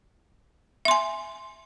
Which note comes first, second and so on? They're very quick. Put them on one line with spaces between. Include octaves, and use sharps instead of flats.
E5 C6 G#5